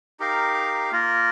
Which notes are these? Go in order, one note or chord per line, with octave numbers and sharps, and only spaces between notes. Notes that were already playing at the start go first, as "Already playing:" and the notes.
D#4 G4 A#4 F5
A#3 F4 A#4